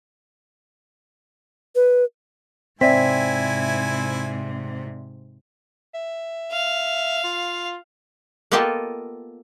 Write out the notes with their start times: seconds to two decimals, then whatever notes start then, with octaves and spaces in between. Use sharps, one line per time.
1.75 B4
2.81 G#2 C3 C4 E4 D5 E5 G#5 B6
5.94 E5
6.52 F5
7.24 F4
8.52 A#3 B3 F4 G4 A4 D#5